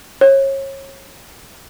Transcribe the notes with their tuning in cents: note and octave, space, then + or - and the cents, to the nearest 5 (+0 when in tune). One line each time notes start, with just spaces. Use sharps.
C#5 -30